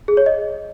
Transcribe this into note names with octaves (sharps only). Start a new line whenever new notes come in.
G#4
C#5
D#5